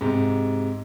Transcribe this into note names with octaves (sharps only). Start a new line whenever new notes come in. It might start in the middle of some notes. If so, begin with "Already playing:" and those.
G#2 C3